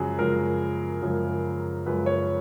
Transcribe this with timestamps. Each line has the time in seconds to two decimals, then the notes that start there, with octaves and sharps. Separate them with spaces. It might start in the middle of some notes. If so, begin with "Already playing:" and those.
Already playing: F#2 C#3 F3 G#3 F#4 G#4
0.19 F#2 C#3 F3 G#3 A#4
1.02 F#2 C#3 F3 G#3
1.86 F#2 C#3 F3 G#3 B4
2.06 C#5